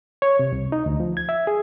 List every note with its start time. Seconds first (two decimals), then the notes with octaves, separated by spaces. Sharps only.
0.22 C#5
0.39 C3
0.52 C2
0.72 D#4
0.86 D2
1.00 F3
1.17 G#6
1.29 E5
1.47 G#4